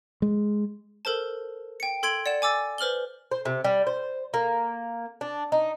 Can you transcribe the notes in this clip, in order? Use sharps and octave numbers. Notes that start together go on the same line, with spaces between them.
G#3
A4 A#4 C5 A5
G5 C#7
A4 C6 G#6 D7 F#7
D5 F#5 E7
G#5 D6 E6 A6
B4 C5 F6 F#7 G7
C5
C3
G3
C5
A#3
D4
D#4